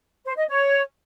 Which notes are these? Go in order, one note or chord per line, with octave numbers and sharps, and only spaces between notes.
C5
D#5
C#5